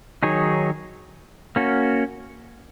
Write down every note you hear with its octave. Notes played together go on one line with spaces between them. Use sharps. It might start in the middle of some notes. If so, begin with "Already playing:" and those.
D#3 F#3 D#4 G#4 C#5
A#3 C#4 F#4